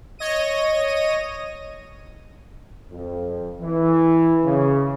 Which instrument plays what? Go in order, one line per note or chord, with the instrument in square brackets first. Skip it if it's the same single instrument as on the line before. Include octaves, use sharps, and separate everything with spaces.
[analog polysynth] C#5 D#5 A#6 D#7
[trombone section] F2
E3
C#3